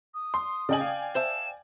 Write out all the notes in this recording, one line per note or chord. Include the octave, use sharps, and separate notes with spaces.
D#6
C6
C#3 D5 D#5 G5 G#5 F#7
F5
C5 E5 A5 E7